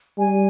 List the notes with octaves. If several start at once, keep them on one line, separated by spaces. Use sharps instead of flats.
G3 G#5